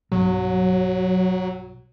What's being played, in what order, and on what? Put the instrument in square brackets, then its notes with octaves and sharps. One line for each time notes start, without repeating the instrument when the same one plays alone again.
[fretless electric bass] B1 G2 [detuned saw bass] F#3